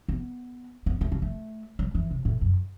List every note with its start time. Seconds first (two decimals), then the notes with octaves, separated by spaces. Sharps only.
0.08 B3
0.86 B3
1.01 A3
1.12 G3
1.22 A3
1.79 G3
1.95 E3
2.11 C3
2.25 A2
2.41 F#2